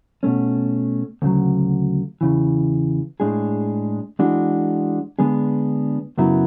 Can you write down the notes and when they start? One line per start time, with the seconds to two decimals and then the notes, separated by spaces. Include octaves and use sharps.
0.23 B2 A3 C#4
1.22 D2 C#3 F#3
2.21 E2 C#3 E3
3.20 A2 G#3 D4 G#4
4.19 E3 G#3 D4 F#4
5.19 D3 G#3 B3 D4 G#4
6.18 F#2 C#3 F#3 B3 E4